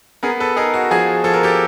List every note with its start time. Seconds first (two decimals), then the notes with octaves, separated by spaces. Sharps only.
0.23 B3 G#4 A#4
0.40 A4 B4
0.56 D#4 G#4 A#4
0.74 F#4
0.91 F3 F#4 G#4
1.24 F3 A4
1.34 A#4
1.43 G4 A4